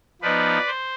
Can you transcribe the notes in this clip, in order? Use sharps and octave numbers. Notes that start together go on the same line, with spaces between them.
F3 B3 D#4 B4 D5
C5